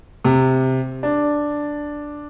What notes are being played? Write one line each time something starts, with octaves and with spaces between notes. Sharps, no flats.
C3
D4